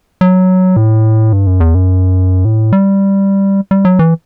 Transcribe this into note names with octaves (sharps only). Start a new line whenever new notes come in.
F#3
A2
G2
F#2
E2
F#2
A2
G3
G3
F#3
E3